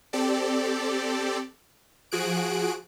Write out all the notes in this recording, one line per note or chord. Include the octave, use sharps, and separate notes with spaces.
C4 G4 A4 D5
F3 F#4 G#4 F#6 D7